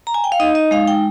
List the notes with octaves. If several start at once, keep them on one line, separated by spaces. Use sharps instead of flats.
A#5
G#5
G5
F5
D#4 D#5
D#5
G#3 F5
G5